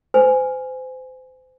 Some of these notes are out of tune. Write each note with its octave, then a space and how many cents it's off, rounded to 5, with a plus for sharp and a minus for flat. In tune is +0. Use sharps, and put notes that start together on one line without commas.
C5 -35 G#5 +0